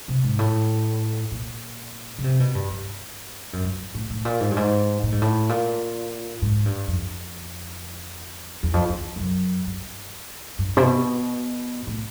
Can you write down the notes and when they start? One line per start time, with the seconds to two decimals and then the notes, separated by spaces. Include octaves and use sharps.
0.08 C3
0.23 G#2
0.39 A2
1.31 A#2
2.18 C#3
2.24 C3
2.40 B2
2.55 G2
2.70 G2
3.53 F#2
3.64 G2
3.94 A2
4.10 A2
4.25 A#2
4.40 G#2
4.50 G2
4.56 G#2
5.03 A2
5.12 G#2
5.22 A2
5.49 A#2
6.42 G#2
6.66 G2
6.88 F2
8.63 E2
8.73 F2
8.89 E2
9.16 F2
9.20 F#2
9.67 G2
10.59 G2
10.77 C3
10.82 B2
11.87 A2